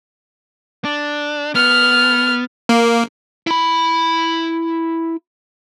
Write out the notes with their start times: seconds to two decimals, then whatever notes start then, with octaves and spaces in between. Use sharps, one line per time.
0.85 D4
1.55 B3 F6
2.69 A#3
3.47 E4 B5